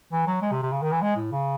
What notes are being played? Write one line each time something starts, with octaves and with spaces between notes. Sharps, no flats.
E3
F#3
G#3
C3
C3
C#3
D#3
E3
G#3
A2
C#3